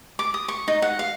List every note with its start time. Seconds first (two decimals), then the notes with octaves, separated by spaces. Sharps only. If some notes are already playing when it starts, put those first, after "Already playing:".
0.19 D6
0.34 D#6
0.48 C#6
0.68 D#4
0.82 F#5
0.99 F5